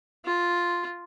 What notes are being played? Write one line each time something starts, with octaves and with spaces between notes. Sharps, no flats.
F4